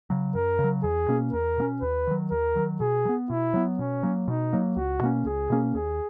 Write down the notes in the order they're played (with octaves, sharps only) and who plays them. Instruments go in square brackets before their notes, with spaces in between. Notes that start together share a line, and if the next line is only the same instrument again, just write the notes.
[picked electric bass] C#3 F#3
[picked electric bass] F#2 [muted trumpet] A#4
[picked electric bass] C#3
F#3
[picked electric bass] E2 [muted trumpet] G#4
[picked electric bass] B2 A#3 C#4
[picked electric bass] E2 [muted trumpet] A#4
[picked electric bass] B2 A#3 C#4
[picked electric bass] D#2 [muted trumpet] B4
[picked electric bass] D#3 F#3
[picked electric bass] D#2 [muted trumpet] A#4
[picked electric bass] D#3 F#3
[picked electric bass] B2 [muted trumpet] G#4
[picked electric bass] F#3
B3
[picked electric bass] B2 [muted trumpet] E4
[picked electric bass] F#3 B3
[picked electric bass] B2 [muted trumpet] C#4
[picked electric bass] F#3 A#3
[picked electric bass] B2 [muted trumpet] D#4
[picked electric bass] F#3 A#3
[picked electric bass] C#2 [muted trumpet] F#4
[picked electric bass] B2 A#3 C#4
[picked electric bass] C#2 [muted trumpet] G#4
[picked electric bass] B2 A#3 C#4
[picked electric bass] D#2 [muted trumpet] G#4